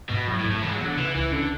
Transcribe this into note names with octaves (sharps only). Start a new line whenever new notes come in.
G#2 B2
A2 F#3
A2
G#2
A2
C#3 E3
G#3
F#3
B3
D3
C#3 E3
C#2 E3
D3 C#4